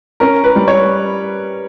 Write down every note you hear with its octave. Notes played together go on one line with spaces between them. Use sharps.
C#4 A#4
B4
G3
C#5